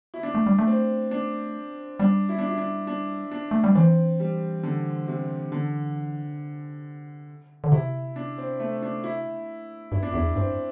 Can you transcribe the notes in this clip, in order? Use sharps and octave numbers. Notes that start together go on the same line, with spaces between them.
E4
D4
A3
G3
A3
C4
D4
G3 D4
E4
D4
E4
D4
D4
D4
A3
G3
E3 C4
G3
D3
C3
D3
D3
C3 E4
D4
C4
A3
D4
E4
G2 E4
D4
E2 E4
G2 C4